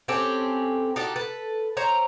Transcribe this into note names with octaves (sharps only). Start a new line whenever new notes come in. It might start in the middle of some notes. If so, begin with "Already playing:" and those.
C4 C#4 G4 A4
D#4 F#4 G4 A4
A4 B4
C5 C#5 A#5